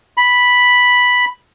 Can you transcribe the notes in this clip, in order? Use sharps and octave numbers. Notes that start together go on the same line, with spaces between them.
B5